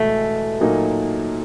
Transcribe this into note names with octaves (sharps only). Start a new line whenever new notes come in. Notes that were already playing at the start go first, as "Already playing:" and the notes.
Already playing: E2 B2 G#3 A3
A#2 F#3 A#3 D#4